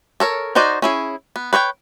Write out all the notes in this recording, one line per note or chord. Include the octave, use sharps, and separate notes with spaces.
A4 A#4 C#5
D#4 F#4 C5 D5 D#5
C#4 E4 G#4
B3
B4 C#5 D5 G5